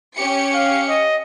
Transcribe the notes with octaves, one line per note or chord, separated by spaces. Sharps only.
C#4 G4 C#7
F5
D#5